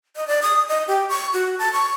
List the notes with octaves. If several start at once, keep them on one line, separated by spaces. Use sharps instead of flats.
D#5
D5
D#6
D#5
G4
C#6
F#4
A5
C#6